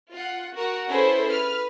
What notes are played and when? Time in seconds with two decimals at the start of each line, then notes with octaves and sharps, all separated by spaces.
0.11 F4 F#5
0.54 F#4 A#4 F#5
0.88 C#4 E4 G#4 A4 B4 C5
1.28 B4 F6